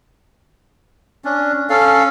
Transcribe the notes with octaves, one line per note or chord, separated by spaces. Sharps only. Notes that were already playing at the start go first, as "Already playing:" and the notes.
C#4 D4
C#4 A4 F5